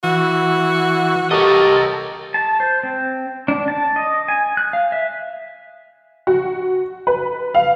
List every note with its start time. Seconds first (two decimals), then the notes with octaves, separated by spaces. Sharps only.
0.04 E3 F#4
1.31 G4 A4 A#4 C#5 D#5
2.34 A5
2.60 C5
2.83 C4
3.48 D4
3.68 A5
3.96 D#5
4.28 G#5
4.57 F#6
4.73 F5
4.92 E5
6.27 F#4
7.07 B4
7.54 F5